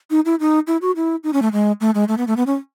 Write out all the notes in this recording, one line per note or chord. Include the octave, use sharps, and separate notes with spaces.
D#4
E4
D#4
E4
F#4
E4
D#4
C#4
A3
G#3
A3
G#3
A3
B3
A3
B3
C#4